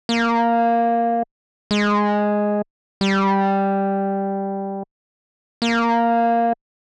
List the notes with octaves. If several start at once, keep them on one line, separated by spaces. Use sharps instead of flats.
A#3
G#3
G3
A#3